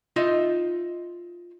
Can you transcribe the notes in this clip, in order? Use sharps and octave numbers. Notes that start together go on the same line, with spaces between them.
D#4 F4 D#5 E5